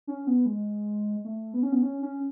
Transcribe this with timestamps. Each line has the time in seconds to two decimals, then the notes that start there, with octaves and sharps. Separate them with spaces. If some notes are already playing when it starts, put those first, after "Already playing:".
0.07 C#4
0.27 B3
0.46 G#3
1.25 A3
1.53 B3
1.63 C#4
1.72 B3
1.82 C#4
2.02 C#4